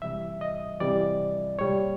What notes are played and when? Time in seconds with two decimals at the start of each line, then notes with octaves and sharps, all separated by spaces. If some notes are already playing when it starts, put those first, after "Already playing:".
0.02 C3 E3 G3 E5
0.41 D#5
0.80 C3 E3 G3 D5
1.59 A#2 G3 C#5